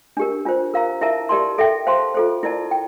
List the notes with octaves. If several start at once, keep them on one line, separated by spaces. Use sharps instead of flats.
D4 G4 A#4
D4 F4 C5
A#4 F5 A#5
E4 A#4 E5 A5
G4 A#4 D5 A5 C6
A4 E5 G5
C5 F5 A5 C6
F4 A4 C5
E4 A#4 D5 A5
G5